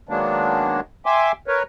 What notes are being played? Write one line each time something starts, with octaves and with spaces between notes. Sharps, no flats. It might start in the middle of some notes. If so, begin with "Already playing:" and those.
D#3 F#3 G#3 A#3 B3 D4
E5 G5 G#5 C6 D6
A#4 B4 C#5